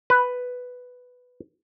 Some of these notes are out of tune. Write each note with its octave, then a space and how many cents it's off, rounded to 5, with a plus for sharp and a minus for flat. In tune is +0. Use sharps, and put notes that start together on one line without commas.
B4 +5